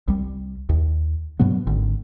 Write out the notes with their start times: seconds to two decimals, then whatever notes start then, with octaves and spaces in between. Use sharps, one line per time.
0.08 C2 G3
0.69 D#2
1.39 G2 B2 F#3 B3
1.67 G#1 D3